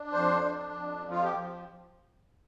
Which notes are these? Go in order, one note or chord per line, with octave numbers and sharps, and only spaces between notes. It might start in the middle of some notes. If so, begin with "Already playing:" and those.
Already playing: D4
F2 C5
D4
F2
F3
F4
G4
F3